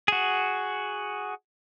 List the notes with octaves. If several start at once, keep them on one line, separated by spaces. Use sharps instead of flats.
F#4 G#4